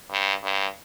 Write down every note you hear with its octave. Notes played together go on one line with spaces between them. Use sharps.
G2
G2